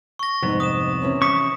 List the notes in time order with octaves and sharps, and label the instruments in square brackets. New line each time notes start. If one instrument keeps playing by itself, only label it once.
[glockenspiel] C#6 A#6
[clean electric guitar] C2 F2 B3 [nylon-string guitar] G#2
[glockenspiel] D#6 E7
[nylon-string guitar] C3 E3 C#4
[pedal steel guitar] C#6 [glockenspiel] D#6 B6